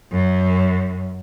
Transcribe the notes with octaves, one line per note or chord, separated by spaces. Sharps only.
F#2